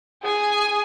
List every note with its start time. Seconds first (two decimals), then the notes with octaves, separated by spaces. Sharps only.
0.23 G#4 G#5